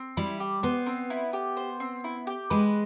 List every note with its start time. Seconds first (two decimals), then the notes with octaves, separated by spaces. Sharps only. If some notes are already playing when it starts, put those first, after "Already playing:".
Already playing: C4
0.17 G3 E4
0.40 G4
0.63 B3 C5
0.87 C4
1.10 E4
1.33 G4
1.57 C5
1.80 C4
2.04 E4
2.27 G4
2.50 G#3 B4